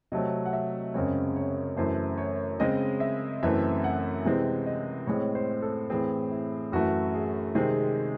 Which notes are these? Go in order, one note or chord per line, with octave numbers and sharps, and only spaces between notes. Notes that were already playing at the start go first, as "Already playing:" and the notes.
C3 F#3 A3 C4 D#5
F#5
E5
F#2 C#3 G#3 C4 C#5
C#5
F#2 E3 A3 C5
C#5
C#3 G#3 C4 D#5
E5
F#2 E3 A3 C4 E5
F#5
C3 E3 G#3 C4
D#5
A2 G#3 C4 C#5
C5
A4
A2 E3 C4 G#4
E4
F#2 E3 A3 F#4
G#4
C3 D#3 G#3 C4 G#4